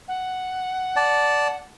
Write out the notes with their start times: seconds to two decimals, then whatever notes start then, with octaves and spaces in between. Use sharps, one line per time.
0.08 F#5
0.96 D5 A5